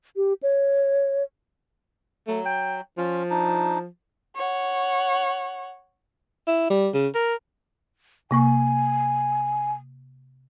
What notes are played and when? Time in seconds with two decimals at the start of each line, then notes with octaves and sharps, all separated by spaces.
0.16 G4
0.43 C#5
2.28 F#3 A3
2.46 G5
2.98 F3 C#4 F4
3.30 D4 D#4
4.36 C#5 F#5
6.47 E4
6.70 G3
6.94 C#3
7.15 A#4
8.31 C3 A#3 G#5 C#6